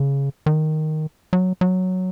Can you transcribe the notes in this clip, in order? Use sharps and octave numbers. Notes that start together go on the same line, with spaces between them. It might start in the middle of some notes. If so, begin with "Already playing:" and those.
Already playing: C#3
D#3
F#3
F#3